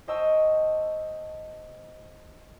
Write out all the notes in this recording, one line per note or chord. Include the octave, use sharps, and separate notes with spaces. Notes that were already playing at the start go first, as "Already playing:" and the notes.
C5 D#5 G5 A5 C#6 E6